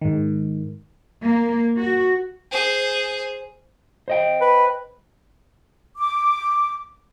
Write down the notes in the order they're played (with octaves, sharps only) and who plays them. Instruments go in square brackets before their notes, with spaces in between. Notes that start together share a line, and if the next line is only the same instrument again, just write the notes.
[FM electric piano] G#2 D#3
[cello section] A#3
F#4
[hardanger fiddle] G#4 C5
[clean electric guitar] C5 D#5 G5
[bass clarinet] B4
[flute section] D6